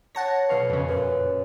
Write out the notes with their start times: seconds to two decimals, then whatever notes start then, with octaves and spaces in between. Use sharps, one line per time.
0.15 C#5 F#5 A5 A#6
0.49 B1 B4 F5 C#6
0.70 F2 C#3
0.88 F#2 A#2 B4